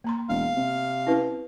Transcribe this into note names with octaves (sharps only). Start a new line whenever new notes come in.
A#3 A#5 C6
E1 F5
C3
C#4 E4 B4